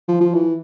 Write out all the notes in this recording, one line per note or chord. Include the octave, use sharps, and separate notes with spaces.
F3
F3
E3